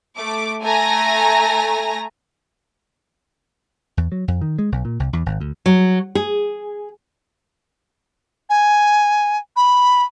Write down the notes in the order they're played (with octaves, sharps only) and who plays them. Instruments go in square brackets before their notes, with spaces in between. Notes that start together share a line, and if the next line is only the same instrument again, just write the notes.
[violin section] A3 D6
A3 G#5 A#5 A#6
[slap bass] E2
F#3
F2
D#3
G#3
B1
A#2
C2
E2
G#1
D2
[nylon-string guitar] F#3
G#4
[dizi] G#5
B5